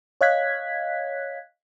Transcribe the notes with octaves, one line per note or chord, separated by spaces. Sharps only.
C#5 D#5 F5 F#6 G#6 B6